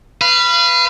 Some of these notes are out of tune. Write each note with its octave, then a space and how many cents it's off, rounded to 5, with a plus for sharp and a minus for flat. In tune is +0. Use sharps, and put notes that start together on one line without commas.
B4 +0 F5 -30